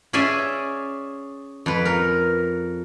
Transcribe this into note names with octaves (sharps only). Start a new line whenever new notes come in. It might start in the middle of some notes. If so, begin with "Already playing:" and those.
C#4 G#4 D5 E5 G#5
F2 B4
A#4